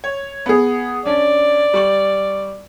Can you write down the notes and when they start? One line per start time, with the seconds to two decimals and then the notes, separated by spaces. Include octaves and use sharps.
0.04 C#5
0.46 B3 G#4
1.06 C#4 D4 D5
1.73 G3 C#6 F#7